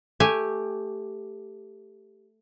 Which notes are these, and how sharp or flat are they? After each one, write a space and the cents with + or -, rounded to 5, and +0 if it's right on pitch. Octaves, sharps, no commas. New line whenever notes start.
A3 +0 G4 +0 G#5 -10